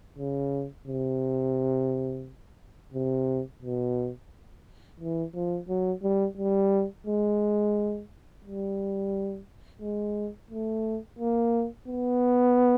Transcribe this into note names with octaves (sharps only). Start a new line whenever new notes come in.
C#3
C3
C3
B2
E3
F3
F#3
G3
G3
G#3
G3
G#3
A3
A#3
B3